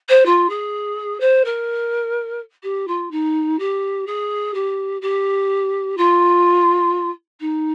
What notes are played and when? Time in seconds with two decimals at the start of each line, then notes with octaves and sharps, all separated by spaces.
0.08 C5
0.25 F4
0.49 G#4
1.20 C5
1.44 A#4
2.63 G4
2.87 F4
3.11 D#4
3.59 G4
4.06 G#4
4.54 G4
5.01 G4
5.97 F4
7.40 D#4